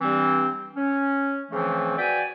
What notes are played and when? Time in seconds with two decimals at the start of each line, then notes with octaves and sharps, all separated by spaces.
0.01 G2 E3 G3 C4
0.76 C#4
1.50 C#3 E3 F3 A3 C4
1.98 F#4 B4 D5 G5 G#5